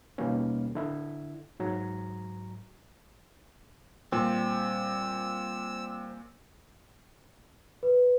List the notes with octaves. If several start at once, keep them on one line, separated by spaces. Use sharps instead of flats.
D#2 B2 G3 A#3 C#4
D3 E4
G#2 F#3 A#5
A#2 G3 C4 E6
B4